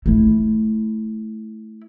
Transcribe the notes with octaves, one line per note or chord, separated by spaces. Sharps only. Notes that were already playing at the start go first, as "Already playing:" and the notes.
A3 E4